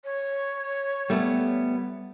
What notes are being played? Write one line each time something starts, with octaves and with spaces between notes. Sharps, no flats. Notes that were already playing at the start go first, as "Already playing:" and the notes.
C#5
G3 A3 B3